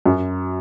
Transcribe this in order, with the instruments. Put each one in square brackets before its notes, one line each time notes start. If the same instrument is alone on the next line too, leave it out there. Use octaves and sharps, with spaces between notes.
[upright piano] F#2